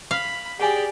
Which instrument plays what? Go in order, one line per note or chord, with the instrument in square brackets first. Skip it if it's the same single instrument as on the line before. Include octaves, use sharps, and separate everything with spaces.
[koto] F5 [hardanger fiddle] B5
[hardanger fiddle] G4 D5 [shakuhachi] G#4 [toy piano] F#5 G#5